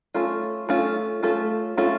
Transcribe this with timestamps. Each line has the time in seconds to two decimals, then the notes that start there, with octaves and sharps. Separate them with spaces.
0.14 A3 C#4 F4 A4
0.69 A3 C#4 F4 A4
1.23 A3 C#4 F4 A4
1.77 A3 C#4 F4 A4